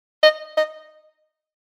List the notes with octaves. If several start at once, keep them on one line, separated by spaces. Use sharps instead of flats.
D#5
D#5